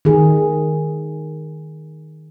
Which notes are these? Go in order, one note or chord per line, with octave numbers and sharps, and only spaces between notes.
D#3 G#4